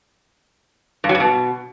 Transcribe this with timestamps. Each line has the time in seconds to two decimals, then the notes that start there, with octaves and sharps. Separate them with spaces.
1.04 G2
1.09 F#3
1.15 G2
1.20 B2